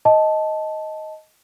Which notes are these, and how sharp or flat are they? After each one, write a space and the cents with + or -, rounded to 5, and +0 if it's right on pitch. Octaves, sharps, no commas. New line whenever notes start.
D#5 +10 A5 -10